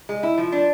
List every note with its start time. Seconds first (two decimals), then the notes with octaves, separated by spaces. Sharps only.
0.09 G#3
0.23 E4
0.38 F3
0.52 D4